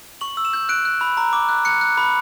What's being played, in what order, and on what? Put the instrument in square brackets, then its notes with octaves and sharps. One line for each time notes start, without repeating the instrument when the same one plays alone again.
[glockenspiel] C#6 F#7
E6
E7
G6
F#6 D7
F#6
B5
A#5
D6
F#6
F#6 C#7
F#6
B5